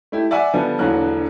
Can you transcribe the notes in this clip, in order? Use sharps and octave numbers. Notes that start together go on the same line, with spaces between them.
A3 E4 G4
D5 E5 F#5 G#5 D6
D3 F3 G3 B3
E1 A#1 D3 E3 F#3 F#6